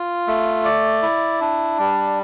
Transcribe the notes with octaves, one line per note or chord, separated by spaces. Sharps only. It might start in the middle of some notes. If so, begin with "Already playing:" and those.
Already playing: F4
A3
D5
E4
D4
G3